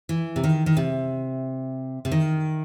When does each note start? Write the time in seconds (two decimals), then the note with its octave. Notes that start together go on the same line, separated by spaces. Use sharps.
0.09 E3
0.36 C3
0.44 D#3
0.66 D#3
0.77 C3
2.05 C3
2.12 D#3